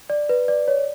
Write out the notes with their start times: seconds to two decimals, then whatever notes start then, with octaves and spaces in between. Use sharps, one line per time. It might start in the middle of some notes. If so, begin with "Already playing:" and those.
0.10 D5
0.29 B4
0.48 D5
0.68 C#5